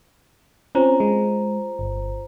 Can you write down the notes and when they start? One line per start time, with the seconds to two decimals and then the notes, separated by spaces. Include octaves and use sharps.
0.75 C4 C#4 F4 C5 A#5
1.00 G#3
1.79 G1